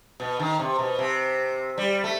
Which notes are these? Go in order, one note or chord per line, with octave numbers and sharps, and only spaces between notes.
B2
D#3
C3
B2
C3
G3
A3